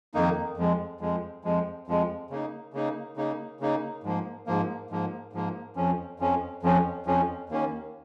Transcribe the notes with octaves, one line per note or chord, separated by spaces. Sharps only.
F2 D#3 A#3 D#4
F2 F3 G#3
F2 F3 G#3
F2 F3 G#3
F2 F3 G#3
C#3 A#3 D#4
C#3 A#3 D#4
C#3 A#3 D#4
C#3 A#3 D#4
G#2 F3 A#3
G#2 F3 A#3
G#2 F3 A#3
G#2 F3 A#3
F2 F3 C#4
F2 F3 C#4
F2 F3 C#4
F2 F3 C#4
D#2 D#3 A#3 C#4